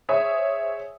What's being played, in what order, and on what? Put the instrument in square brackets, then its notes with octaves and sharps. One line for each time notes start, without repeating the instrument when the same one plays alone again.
[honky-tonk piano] G#4 C5 C#5 E5 D#6